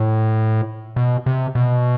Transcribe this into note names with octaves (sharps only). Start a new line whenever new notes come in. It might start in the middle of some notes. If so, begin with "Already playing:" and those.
Already playing: A2
B2
C3
B2